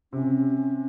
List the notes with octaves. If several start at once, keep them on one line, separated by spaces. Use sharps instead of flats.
C3 C#4